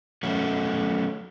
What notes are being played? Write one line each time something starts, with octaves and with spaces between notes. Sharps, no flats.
F#3 A3 C#4 F#4